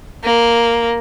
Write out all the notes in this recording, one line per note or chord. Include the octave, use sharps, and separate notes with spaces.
A#3